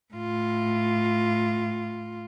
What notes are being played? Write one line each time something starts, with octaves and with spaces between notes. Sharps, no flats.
A2 F4